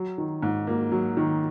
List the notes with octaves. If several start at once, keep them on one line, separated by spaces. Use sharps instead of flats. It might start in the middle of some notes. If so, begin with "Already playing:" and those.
Already playing: F#3
D#3
G#2
A#3
F#3
D#3